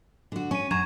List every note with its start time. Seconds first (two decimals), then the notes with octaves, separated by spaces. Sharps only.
0.32 D3 F#4
0.51 C#4 C#6 D#7
0.71 F#2 A#5 C#6 G#6 E7